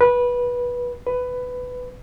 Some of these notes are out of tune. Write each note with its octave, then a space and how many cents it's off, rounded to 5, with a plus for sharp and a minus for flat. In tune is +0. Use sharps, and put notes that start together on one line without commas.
B4 -15
B4 +15